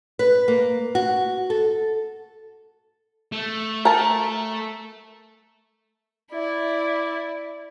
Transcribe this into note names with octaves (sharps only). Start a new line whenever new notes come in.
B4
A#3
F#4
A4
A3
A#4 A5
E4 D5